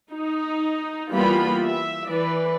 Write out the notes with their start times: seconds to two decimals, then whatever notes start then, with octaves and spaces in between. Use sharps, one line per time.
0.12 D#4
1.12 E3 G3 A#3 B3 F4 B5
1.66 E5
2.10 E3 B4 D5